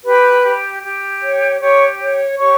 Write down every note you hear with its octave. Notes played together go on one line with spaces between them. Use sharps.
G4 B4 B5
G4
G4
C#5
G4 C#5 C#6
C#5
G4 C#5 C#6